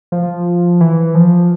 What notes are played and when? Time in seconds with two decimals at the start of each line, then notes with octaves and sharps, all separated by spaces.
0.12 F3
0.81 E3
1.15 F3